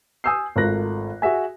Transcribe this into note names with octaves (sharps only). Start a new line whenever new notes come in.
G#5 D#6 E6 G6 C7
G#1 A3 F4 A#4 F#6 A#6
F#4 G#4 E5 G#5